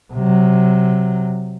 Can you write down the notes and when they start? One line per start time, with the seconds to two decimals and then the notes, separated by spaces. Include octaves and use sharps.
0.13 C3 F#3